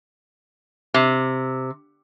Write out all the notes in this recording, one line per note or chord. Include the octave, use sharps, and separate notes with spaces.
C3